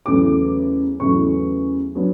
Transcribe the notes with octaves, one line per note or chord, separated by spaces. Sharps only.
E2 C#3 F#3 A3 E4 D6
E2 C#3 F#3 A3 E4 C#6
F#3 B3 D4